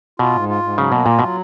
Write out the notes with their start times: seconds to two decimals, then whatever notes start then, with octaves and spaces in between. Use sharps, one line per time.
0.19 B2 F4
0.34 G#2
0.49 F4
0.63 G#2
0.78 C#3 F#3
0.92 B2 A#3
1.06 A#2 F4
1.19 B2
1.22 F#3